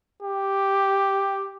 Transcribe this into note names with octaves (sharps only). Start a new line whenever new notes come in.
G4